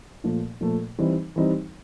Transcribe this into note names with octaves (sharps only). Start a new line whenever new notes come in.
A#2 F3 A3
A#2 F3 A3
E3 G3 C4 D#4
E3 G3 C4 D#4